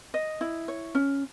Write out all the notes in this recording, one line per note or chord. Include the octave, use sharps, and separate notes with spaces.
D#5
E4
C#5
C#4